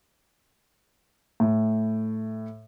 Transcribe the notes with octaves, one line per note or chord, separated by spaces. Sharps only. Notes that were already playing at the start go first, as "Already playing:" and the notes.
A2